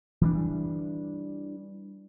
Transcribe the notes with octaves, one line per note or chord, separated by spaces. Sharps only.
E3 G3 D4